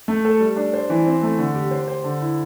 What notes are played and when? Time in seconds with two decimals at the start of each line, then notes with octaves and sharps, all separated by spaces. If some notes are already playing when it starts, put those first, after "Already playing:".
0.08 A3
0.25 A4
0.40 G3
0.56 D4
0.73 C5
0.90 E3
1.06 C4
1.23 A3
1.38 D3
1.55 G4
1.71 C5
1.88 C5
2.04 D3
2.21 E4